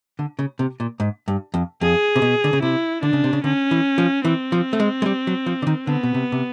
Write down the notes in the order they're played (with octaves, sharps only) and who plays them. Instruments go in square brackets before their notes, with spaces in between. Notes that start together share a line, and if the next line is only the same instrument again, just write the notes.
[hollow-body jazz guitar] D3
C#3
C3
A#2
G#2
G2
F2
[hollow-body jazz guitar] F2 [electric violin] G#4
[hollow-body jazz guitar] C3
B2
D3
C#3
[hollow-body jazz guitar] C3 [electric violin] E4
[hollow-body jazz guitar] D3 [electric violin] D4
[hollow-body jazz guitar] C#3
C3
C#3
[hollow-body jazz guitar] D3 [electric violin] C#4
[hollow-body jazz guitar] E3
F3
[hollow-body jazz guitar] E3 [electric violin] C4
[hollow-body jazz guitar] F3
A3
G#3
G#3
G3
F#3
F3
D3
D#3
[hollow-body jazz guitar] D3 [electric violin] B3
[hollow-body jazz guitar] B2
C3
C3